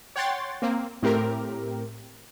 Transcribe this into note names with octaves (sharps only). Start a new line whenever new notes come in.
C#5 F#5 G5 C6 A6
A#3 C4
A2 C4 G4 A#4